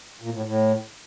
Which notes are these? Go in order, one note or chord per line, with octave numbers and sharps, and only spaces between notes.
A#2
A2
A2